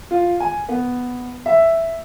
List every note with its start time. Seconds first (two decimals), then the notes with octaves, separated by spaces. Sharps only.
0.11 F4
0.40 G#5
0.69 B3
1.46 E5